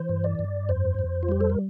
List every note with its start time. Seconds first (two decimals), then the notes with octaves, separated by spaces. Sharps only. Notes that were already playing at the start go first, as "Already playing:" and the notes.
Already playing: E3 C5
0.09 G2
0.24 D5
0.39 G2
0.69 F2 C5
0.99 F2
1.23 F4
1.29 G3 G4
1.41 A4
1.50 A#4